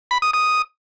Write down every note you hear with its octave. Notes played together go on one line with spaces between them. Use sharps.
B5
D#6
D#6